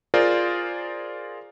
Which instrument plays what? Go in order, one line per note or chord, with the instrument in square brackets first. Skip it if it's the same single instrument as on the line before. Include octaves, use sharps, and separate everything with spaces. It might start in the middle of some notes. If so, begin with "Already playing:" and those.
[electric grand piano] F4 G#4 A#4 C5 D5